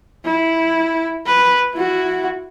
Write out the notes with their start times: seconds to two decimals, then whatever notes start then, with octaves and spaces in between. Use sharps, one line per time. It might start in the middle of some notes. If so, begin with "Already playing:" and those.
0.24 E4
1.26 B4
1.74 E4 F#4